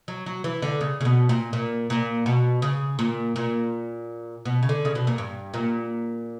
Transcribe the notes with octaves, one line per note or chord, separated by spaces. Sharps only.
F#3
F#3
E3
D3
C#3
C#3
B2
A#2
A#2
A#2
B2
C#3
A#2
A#2
B2
C#3
D3
C#3
B2
A#2
G2
A#2